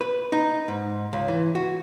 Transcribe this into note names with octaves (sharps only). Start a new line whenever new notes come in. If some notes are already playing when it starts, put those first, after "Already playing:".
B4
D#4
G#2
C#2
E3
F#4